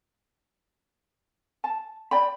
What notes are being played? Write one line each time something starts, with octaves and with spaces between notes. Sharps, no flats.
A5
D5 G5 B5